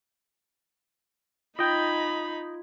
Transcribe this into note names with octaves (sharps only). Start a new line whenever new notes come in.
D#4 F4 D#5 G5 B5 G#6